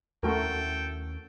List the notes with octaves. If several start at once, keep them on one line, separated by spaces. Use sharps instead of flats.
D#2 A3 C#4 F#4 A4 A#4 G5